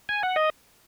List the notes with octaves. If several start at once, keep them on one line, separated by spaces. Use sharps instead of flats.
G#5
F#5
D#5